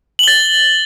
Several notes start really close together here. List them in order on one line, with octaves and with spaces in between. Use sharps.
F#7 G7 A6